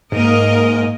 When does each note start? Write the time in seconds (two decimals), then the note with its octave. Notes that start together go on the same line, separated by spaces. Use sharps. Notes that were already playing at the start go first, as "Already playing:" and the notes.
0.12 G#2 A#3 A#4 D#5